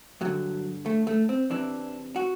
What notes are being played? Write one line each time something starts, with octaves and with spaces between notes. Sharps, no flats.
G2 D3 F#3
A3
A3
C4
E2 C3 E3 D4
F#4